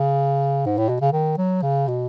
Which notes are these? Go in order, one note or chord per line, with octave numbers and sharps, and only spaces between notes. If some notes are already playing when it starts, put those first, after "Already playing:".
Already playing: C#3
G#2
A2
B2
C#3
D#3
F#3
C#3
B2